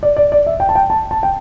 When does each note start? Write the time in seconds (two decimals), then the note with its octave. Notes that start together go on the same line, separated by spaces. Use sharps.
0.03 D5
0.17 D5
0.32 D5
0.47 E5
0.60 G5
0.69 A5
0.75 G5
0.90 A5
1.11 A5
1.23 G5